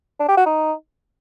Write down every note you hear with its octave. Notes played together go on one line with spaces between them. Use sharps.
D4
G4
F#4
D#4